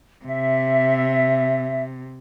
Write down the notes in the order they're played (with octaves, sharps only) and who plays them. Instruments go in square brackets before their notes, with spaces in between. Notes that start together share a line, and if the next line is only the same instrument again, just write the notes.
[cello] C3 [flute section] E5